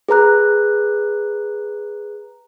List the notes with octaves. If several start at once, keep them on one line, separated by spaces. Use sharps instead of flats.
G#4 B4 A#5 F#6